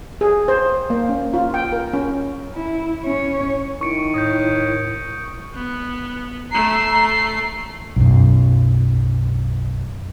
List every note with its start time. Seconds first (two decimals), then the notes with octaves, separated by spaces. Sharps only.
0.21 G#4
0.48 C5
0.90 A#3
1.09 C#4
1.34 F4
1.54 G5
1.73 A#4
1.93 C#4
2.55 E4
3.04 C#4 C#5
3.81 D#3 E4 C#6 C#7 D7
4.14 A2 D#6 G6
5.55 B3
6.52 A3 A#5 C7
7.96 B1 F#2